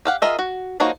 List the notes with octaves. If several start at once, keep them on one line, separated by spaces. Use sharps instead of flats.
G4 F5 F#5
F4 G#4 A#4 D#5 E5
F#4
F3 A#3 D#4 F#4 C#5